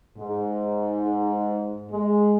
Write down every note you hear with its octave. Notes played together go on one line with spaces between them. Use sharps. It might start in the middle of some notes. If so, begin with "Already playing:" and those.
G#2
G#3